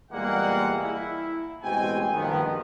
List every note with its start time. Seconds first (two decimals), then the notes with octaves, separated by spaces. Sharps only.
0.12 E2 A#2 G3 G#3 A#3 F#5
0.78 E4
1.64 A1 B2 G#3 C4 G5 G#5
2.14 F#1 G2 D#3 F3 B3